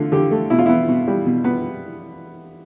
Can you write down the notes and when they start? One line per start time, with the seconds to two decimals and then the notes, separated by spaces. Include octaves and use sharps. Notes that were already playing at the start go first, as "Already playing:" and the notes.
Already playing: D3 A3 F4
0.12 D3 G4
0.31 A3
0.50 B2 E4
0.59 F4
0.66 B3 E4
0.88 B2
1.08 G3
1.26 B2
1.44 B3